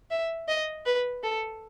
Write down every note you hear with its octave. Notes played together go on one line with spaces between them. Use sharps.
E5
D#5
B4
A4